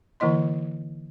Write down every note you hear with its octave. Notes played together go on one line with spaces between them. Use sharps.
D3 E3 A#3 E4 D#5 C6